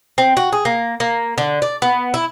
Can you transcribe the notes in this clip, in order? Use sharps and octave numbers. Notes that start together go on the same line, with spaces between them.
C4
F#4
G#4
A#3
A#3
D3
D5
B3
E4